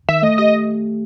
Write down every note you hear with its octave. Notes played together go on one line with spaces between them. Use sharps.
D#3 E5
A3 D#5
G4 D#5